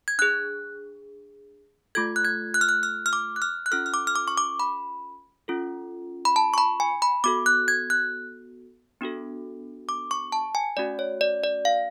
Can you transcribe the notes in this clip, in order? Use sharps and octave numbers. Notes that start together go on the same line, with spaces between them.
G#6
D4 G#4 F#6
A3 F4 A4 G#6
F#6
G#6
F#6
F6
F#6
F6
F6
D6
F#6
F6
F#6
C#4 F4 A4 F6
F6
D6
F6
D6
C#6
D6
B5
C#4 F4 A4
B5
A5
C#6
B5
G#5
B5
B3 F#4 A4 D6
F#6
G#6
F#6
B3 D4 F#4 A4
D6
C#6
A5
G#5
A3 C#4 F#4 D5
C#5
D5
D5
F5